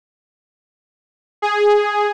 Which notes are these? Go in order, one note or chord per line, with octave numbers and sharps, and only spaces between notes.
G#4